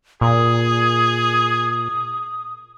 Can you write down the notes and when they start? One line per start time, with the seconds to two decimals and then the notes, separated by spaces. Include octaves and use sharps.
0.21 A#2 G#4 D#6